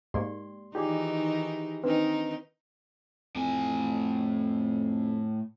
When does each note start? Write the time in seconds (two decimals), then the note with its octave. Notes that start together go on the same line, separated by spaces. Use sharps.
0.14 G#2 A#3 G4 D5 G5 C6
0.75 D#3 E3 D#4 F4 G4 G#4 D5 D6
1.84 D#3 C4 D4 D#4 B4
3.36 F2 A2 G#5